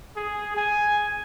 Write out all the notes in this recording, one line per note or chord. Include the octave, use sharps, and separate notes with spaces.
G#4
G#5